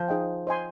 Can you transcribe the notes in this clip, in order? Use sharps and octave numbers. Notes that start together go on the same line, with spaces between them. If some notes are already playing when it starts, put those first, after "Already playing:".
Already playing: F3
D#4 G#4 D#5 G5
C5 D#5 G#5 C6